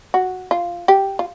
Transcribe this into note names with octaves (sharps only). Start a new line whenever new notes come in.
F#4
F4
G4
F4